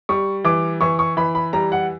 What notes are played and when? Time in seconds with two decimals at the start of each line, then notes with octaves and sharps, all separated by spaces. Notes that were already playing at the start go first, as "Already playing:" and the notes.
0.09 G3 C#6
0.44 E3 D6
0.81 E3 C#6
0.99 C#6
1.17 E3 B5
1.35 B5
1.53 G3 A#5
1.72 F#5